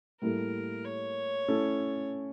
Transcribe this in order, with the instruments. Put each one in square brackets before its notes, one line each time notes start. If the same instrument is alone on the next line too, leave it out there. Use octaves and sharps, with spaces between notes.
[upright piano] A2 G3 A#3 E4 A4 [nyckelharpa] A#4
[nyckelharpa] C#5
[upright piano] A3 C#4 E4 A4